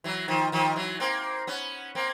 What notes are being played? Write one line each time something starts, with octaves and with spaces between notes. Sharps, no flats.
E3 F#3
D#3 F3
D#3 F3
E3 F#3
A#3 C4
B3 C#4
A#3 C4